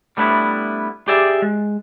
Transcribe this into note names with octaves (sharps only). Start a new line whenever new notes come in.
G3 A3 B3 D4 E4
G4 G#4 D5 E5
G#3